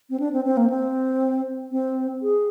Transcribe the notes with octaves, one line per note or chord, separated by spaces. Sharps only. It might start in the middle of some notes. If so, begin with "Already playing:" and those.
C4
D4
C4
C4
A#3
C4
C4
G#4